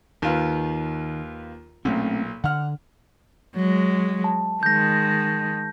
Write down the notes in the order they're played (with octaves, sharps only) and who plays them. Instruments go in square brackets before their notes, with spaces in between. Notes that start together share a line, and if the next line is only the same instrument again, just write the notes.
[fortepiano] D#2 F4 B4 [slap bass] D#3
[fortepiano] B1 A#2 [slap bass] A3 C4 C#4
[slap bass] D3 [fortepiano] F#5 F6
[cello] F#3 G#3
[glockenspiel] A5
[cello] D#3 G#3 [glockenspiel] G6 A#6